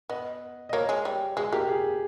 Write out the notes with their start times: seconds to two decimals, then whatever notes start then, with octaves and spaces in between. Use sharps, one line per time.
0.10 B3 D#5
0.69 D#5
0.73 A#3 C#5
0.89 G#3
1.05 G3
1.37 G#3 G#4
1.53 A#3 G4
1.69 G#4